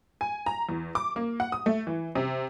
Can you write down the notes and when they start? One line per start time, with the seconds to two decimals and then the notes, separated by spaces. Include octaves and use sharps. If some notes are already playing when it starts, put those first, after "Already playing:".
0.21 G#5
0.46 A#5
0.69 E2
0.95 D6
1.16 A#3
1.40 F#5
1.52 D#6
1.66 A3
1.87 E3
2.15 C3